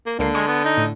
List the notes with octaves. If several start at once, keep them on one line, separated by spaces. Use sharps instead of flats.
A#3
C#2 D3 A#3 C7
G#3 C#6 D#6
B3
D#4
A2